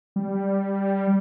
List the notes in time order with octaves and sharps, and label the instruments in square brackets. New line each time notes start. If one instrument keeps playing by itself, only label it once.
[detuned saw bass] G3